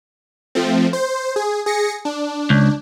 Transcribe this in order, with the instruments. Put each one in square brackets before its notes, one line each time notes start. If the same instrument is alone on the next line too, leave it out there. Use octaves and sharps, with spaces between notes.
[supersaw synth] F3 A3 C4
C5
G#4
G#4 A#6 C#7
D4
[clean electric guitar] C#2